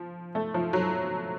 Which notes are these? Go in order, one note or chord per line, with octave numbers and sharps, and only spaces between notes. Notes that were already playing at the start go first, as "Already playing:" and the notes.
Already playing: F3
A3
F3
F#3